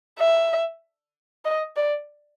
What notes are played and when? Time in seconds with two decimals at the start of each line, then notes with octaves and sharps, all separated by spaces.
0.19 E5
1.45 D#5
1.76 D5